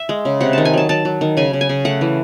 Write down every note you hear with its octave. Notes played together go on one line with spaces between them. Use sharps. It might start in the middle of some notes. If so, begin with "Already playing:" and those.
Already playing: E5
G#3
C#3
C3 F#5
D#3 A5
G#5
F#3 A5
F#3 A5
F#3
D#3
C#3 G#5
C#3
G#5
C#3
A3 F#5
E3